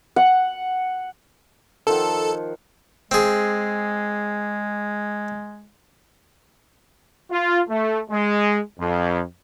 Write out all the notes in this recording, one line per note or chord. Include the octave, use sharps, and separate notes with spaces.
F#5
D#3 F3 A4 F#5
G#3 C4 G#4
F4
A3
G#3
F2